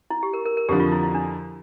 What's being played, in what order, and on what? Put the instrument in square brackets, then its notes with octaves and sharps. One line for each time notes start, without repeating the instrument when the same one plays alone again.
[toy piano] E4
G4
A#4
A#4
A#4
[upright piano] F2 D3 F3 [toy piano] G4
[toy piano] F4
E4
E4
D4